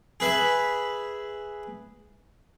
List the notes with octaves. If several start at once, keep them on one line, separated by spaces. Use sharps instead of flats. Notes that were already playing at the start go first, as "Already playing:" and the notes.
G#4 B4 E5